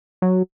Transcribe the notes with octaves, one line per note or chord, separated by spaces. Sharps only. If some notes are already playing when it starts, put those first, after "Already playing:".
F#3